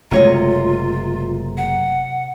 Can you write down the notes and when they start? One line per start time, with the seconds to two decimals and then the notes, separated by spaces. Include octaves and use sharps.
0.11 F#1 C3 G#3 A3 F4 C#5 D#5 A#5
1.57 F#5